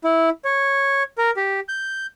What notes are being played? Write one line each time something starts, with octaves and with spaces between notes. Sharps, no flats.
E4
C#5
A#4
G4
G6